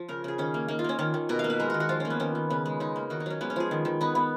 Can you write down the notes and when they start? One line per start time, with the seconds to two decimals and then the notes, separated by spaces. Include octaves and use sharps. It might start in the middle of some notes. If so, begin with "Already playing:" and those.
Already playing: F3
0.09 C#3 A#4
0.24 C#3 G#4
0.38 D#3 C#4
0.54 A#3
0.68 A#3 D#4
0.79 F4
0.84 A#3 C#4
0.99 D#3 C#4
1.14 D#3
1.29 B2 A#4
1.39 F5
1.44 A#3
1.50 B4
1.60 G#3 A#4
1.70 D#3 F#4
1.80 F#4
1.89 F3 F4
2.00 A#3 C#4
2.10 B3
2.20 D#3 C#4
2.35 D#3
2.50 C#3 B3
2.66 G#3
2.80 C#3 D#4
2.96 A#3
3.10 D#3 F#4
3.20 D#4
3.26 F#3 C#4
3.41 G#3 B3
3.50 C#4
3.56 F3 G#4
3.71 D#3
3.85 D#3
4.01 B3 D#4
4.15 B3